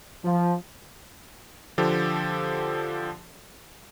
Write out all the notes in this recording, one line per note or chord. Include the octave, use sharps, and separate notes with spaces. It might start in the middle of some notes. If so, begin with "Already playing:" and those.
F3
D3 F3 G4 A4